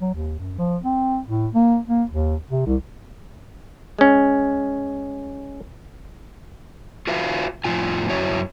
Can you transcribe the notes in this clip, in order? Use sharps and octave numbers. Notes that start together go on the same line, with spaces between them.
F#3
D#2
F#2
F3
C4
A2
A#3
A#3
D#2
C3
C2
G#3 C#4
F4 F#4 B4 E5 F5
F2 A2 C#3 F3 F4 G#5
F#2 E4 F#4 C#5 E5